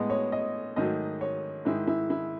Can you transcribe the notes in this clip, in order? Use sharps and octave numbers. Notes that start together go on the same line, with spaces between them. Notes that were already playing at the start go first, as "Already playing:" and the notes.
Already playing: A2 G#3 B3 D#5
C#5
D#5
G#2 D#3 F#3 A3 D#5
C#5
G#2 D#3 G#3 E4
E4
E4